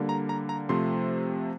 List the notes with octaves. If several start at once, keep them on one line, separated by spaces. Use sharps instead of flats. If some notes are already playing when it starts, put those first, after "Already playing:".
Already playing: D3 G3 A#3
A#5
A#5
A#5
C3 F3 A3 C4 C6